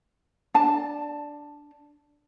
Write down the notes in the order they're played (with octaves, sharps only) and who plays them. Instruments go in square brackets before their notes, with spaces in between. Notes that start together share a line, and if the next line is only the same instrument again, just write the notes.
[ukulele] D4 A5